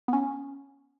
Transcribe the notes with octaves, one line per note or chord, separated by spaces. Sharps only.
B3
C#4